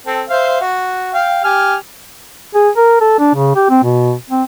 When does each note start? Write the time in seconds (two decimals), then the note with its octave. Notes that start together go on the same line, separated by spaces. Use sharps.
0.06 C4 A4
0.30 C5 E5 F5
0.61 F#4
1.14 F5 G5
1.44 G4 G#5 F6
2.54 G#4
2.77 A#4
3.01 A4
3.19 D4
3.35 C#3
3.56 G4
3.70 C4
3.83 B2
4.30 C4